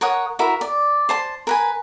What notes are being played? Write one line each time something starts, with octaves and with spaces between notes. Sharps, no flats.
A#4 C#5 F#5 D#6
E4 F#4 A#4 E5
D5
C5 A5 C6
A#4 B4 G#5